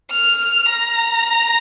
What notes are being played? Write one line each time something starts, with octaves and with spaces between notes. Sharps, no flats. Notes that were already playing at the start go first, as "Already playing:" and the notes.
F6
A#5